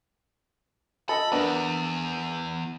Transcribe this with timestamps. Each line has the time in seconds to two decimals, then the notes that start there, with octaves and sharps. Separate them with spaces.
1.09 A4 D#5 B5
1.32 E2 B3 D4 A#4